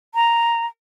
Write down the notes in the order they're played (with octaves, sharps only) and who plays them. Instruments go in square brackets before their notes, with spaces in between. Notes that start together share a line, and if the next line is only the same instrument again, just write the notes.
[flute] A#5